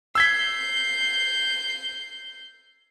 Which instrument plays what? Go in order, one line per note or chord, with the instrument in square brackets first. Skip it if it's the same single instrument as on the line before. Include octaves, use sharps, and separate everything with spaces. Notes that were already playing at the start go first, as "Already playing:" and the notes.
[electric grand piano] E6 G#6 B6 [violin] G6 C7